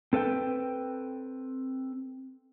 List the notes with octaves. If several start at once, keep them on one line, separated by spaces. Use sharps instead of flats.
C4 A4 B4 F5 G5